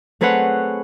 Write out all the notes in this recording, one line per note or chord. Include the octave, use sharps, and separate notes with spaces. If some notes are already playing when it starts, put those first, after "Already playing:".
A3 C4 G#4 B4 C#5 F#5